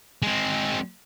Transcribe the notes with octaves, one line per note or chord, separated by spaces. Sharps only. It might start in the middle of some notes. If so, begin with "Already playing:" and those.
G#3 C4